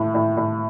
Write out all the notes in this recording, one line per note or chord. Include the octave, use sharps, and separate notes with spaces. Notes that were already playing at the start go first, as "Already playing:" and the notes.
Already playing: A2
A2
A2